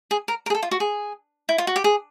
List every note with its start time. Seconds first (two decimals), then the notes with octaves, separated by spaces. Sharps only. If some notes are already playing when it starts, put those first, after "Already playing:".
0.11 G#4
0.28 A#4
0.46 A#4
0.50 G#4
0.55 A4
0.63 F4
0.71 F#4
0.80 G#4
1.49 E4
1.58 F4
1.67 F#4
1.76 G4
1.84 G#4